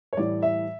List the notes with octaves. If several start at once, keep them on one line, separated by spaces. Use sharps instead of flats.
C#5
A2 E3 G3 D5
E5